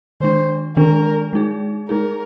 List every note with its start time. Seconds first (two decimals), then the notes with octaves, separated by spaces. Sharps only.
0.20 D#3 G#3 D4 C5
0.77 D#3 G#3 D4 A#4
1.33 G#3 D#4 G#4
1.89 G#3 D#4 G#4 A#4